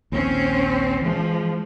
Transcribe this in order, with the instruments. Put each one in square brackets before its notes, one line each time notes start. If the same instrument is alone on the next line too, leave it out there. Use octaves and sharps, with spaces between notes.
[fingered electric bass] A#1 D#2 [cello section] C4 C#4
[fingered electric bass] E3 G#3 [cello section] F3